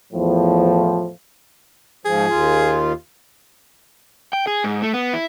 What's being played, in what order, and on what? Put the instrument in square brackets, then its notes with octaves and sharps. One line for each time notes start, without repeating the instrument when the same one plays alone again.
[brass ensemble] E2 A2 F3
[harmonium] G#2 F3 [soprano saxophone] G#4
[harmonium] D#2 F4
[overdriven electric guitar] G5
G#4
G#2
A3
B3
E4